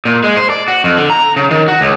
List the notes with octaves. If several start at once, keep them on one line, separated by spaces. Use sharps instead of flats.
A#2
G#3
C5
D5
F#4
F2
D3
A#5
C#3
D#3
F#4
C#2